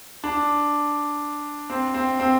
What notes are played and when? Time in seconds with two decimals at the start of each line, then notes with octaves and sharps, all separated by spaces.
0.24 D4
1.70 C4
1.94 C4
2.20 C4